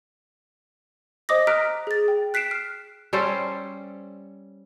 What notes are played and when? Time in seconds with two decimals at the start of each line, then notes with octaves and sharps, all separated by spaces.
1.29 C5 D#5 D6 D#6 A#6
1.47 A#5 F6 F#6 A#6 B6 D7
1.87 G#4 A6
2.08 G5
2.34 F#6 B6 C7 D7 E7
2.51 F6
3.13 G3 C#4 A4 C5